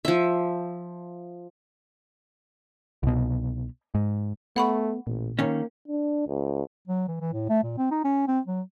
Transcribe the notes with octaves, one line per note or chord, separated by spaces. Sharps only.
F3 E5
C2 B2
G#2
A3 B3 F#5 B5 C#6
A1 A#2
D#3 A#3 C#4
D4
C#2
F#3
E3
E3
A2
A3
A#2
C4
D#4
C#4
C4
F#3